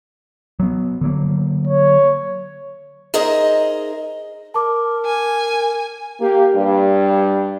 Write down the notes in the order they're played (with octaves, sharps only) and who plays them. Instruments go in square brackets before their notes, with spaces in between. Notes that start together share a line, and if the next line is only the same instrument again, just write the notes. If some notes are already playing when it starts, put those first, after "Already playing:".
[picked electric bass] F#3 B3
D3 F#3 A#3
[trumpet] C#5
[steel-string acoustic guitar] D#4 G#4 A#4 C5 D#5 E5
[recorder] A#4 [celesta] A5 D6
[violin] G#5
[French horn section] A#3 G4
G2 G3